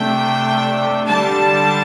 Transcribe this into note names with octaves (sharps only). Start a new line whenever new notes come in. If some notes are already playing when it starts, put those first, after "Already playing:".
Already playing: C3 A3 D4 G5
D3 G3 D4 A5